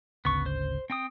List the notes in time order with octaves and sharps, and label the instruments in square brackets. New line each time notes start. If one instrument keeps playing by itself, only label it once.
[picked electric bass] G#1 D2 C#3 [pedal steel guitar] B3 C#6
[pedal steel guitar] C5
C4 G5 D#6